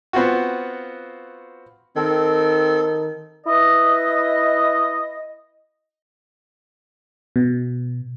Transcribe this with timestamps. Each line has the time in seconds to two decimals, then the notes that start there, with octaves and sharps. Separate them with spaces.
0.13 B3 C4 F4 F#4
1.96 D#3 C4 A4
3.46 E4 B4 D#5
7.36 B2